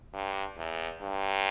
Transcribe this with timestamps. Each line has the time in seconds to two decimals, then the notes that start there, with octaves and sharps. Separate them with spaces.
0.13 G2
0.57 E2
1.02 G2